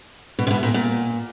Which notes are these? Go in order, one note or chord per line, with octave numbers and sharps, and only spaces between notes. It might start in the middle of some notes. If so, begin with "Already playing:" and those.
B2
C3
B2
A#2
A#2